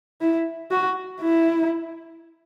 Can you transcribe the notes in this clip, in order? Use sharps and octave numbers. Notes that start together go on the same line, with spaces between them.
E4
F#4
E4